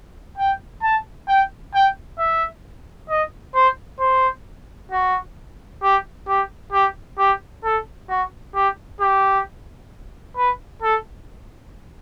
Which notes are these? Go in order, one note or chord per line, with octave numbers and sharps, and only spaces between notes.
G5
A5
G5
G5
E5
D#5
C5
C5
F#4
G4
G4
G4
G4
A4
F#4
G4
G4
B4
A4